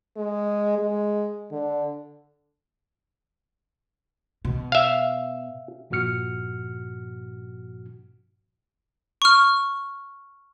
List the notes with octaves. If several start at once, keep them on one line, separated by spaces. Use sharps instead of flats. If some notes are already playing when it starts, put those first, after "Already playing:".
G#3
G#3
D3
B2
E5 F5
G2 A#2 F3 F#4 F6 C#7
C#6 F6